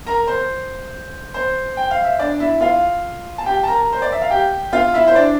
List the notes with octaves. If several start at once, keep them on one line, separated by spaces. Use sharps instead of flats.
A#4 A#5
C5
C5
G5
F5
E5
D4 D5
E4 E5
F4 F5
A5
G4 G5
A5
A#4 A#5
C5
D5
E5
F5
G4 G5
F4 F5
E4 E5
C5
D4 D5